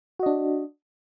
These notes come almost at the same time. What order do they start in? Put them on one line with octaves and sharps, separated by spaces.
F#4 D#5 D4